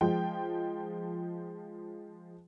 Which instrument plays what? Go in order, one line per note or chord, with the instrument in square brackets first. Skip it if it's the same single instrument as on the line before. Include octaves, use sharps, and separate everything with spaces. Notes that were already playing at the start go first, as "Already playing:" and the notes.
[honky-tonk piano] F3 G#3 G5